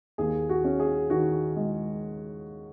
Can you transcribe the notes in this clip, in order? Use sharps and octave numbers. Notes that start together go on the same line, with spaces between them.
D#2 G#4
F#4
C#4
G#4
D#3 F#4
G#3